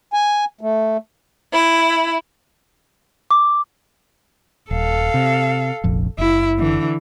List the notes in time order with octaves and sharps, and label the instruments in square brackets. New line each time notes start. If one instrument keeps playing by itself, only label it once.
[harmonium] G#5
A3
[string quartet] E4
[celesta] D6
[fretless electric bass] D#1 [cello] A4 F5
[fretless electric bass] C3
F1 A#1 F2
[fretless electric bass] F#1 [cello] E4
[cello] D3 E3